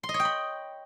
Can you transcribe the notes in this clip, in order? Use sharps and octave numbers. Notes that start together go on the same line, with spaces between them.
C6
D#5
C#5
G5
B5